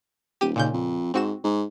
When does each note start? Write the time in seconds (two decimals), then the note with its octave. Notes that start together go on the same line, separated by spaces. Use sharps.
0.41 D#1 G4 D#7
0.56 D#2 A#2 C#3 G6
0.73 F2
1.14 G#2 C4 F#4 E7
1.44 G#2